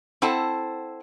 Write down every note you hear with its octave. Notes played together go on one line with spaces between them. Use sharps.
C4 E4 A4 C5 F#5 A5